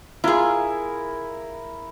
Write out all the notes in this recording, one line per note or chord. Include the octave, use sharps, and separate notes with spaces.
E4 F4 G#4 A#4